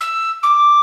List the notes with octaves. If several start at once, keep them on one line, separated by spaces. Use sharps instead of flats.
E6
D6